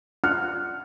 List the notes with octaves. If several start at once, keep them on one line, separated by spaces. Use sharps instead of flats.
D4 F4 F#5 F6